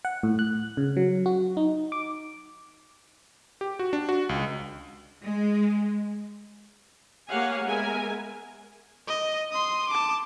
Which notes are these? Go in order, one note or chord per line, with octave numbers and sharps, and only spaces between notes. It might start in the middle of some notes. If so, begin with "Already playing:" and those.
F#5
A2
F#6
C#3
F#3
F#4
D#4
D6
G4
F#4
D4
F#4
C#2
G#3
A#3 G4 C#5 F5 F#5 G#5
G#3 B3 A#4 E5 G#5
D#5
C6 D#6
A5 D6